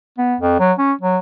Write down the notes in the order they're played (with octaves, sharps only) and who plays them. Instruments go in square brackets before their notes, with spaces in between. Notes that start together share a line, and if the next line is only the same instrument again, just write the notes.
[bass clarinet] B3
F2
F#3
C#4
F#3